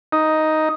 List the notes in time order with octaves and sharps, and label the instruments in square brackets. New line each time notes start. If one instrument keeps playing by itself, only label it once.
[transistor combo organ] D#4